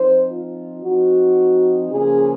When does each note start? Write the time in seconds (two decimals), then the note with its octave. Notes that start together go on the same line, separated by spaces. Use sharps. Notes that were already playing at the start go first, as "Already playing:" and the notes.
Already playing: F3 C4 D#4 C5
0.29 F4
0.84 F3 C4 D#4 F#4
1.91 C#3 F3 A#3 C#4 G#4